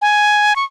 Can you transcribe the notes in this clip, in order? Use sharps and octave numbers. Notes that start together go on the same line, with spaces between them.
G#5
C#6